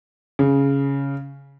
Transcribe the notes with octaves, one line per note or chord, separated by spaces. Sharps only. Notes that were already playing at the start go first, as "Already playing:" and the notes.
C#3